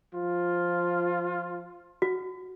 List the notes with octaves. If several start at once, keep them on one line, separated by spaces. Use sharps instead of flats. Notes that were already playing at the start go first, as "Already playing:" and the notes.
F3 F4
F#4